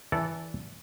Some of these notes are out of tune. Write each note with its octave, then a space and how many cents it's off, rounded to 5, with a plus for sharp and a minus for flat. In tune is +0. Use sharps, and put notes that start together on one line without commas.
E3 -5 A4 -5 D5 -20